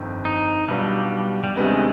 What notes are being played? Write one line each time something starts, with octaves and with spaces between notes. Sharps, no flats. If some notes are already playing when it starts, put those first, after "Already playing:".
Already playing: G1 F2 D#3
D#4
B1 B2 G3 B3 D4 F4
G3
D2 C3 D#3 G#3 B3 D4